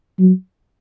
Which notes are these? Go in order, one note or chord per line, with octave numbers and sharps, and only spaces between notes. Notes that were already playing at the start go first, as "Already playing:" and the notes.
F#3